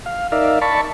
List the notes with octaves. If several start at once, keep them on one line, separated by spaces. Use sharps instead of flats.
F5
D#4 A#4 D5 E5 F5
D5 A5 B5 C#6